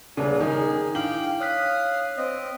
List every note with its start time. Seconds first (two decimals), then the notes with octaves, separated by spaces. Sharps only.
0.17 D#1 C#3 D4
0.40 D#3 G#4
0.95 D4 E4 F5 G5 D6 F#7
1.41 C#5 F5 D#6 F#6 B6
2.18 C4 D#5